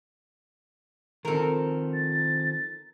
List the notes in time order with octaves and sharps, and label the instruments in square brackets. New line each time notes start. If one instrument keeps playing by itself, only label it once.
[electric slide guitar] D#3 F3 C4 [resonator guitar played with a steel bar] A4 A#4
[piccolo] A6